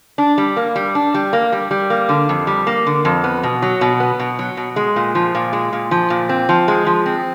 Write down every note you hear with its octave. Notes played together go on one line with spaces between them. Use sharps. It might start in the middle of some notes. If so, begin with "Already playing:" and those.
D4
G3
A#3
G3
D4
G3
A#3
G3
G3
A#3
D3
F2
G3
A#3
D3
F2
B3
B2
F#3
B2
B3
B2
F#3
B2
G#3
A#2
F3
A#2
G#3
A#2
F3
A#2
C4
F3
G#3
F3
C4